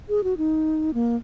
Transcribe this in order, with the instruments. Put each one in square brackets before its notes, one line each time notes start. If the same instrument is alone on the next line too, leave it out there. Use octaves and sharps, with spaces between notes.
[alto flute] G#4
F#4
D#4
A#3